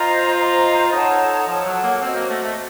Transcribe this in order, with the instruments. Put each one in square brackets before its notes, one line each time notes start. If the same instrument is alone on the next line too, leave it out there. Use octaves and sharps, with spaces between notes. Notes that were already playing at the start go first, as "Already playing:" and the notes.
Already playing: [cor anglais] F4 [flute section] C5 D#5 A#5
[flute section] C5 D#5 A#5
[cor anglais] D#4 [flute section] A4 C#5 F#5 A5
[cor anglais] F3 [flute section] A4 C#5 F#5 A5
[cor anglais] F#3
A#3
[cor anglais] C4 [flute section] F#4 C5 D#5
[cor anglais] A#3
A3
A3